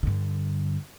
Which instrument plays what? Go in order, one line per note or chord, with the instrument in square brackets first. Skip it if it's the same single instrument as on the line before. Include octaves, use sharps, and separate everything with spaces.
[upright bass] G2 D3